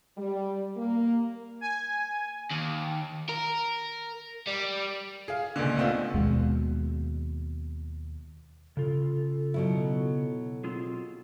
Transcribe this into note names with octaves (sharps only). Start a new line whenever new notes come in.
G3
A#3
G#5
D#2
A#4
G3
G#4 F5
C#2 A#2 D3
A3 B3 C4 D4 F4
D#2 B2 G#3
C#3 F4 A4
B2 F#3 E4
C4 F4 G#4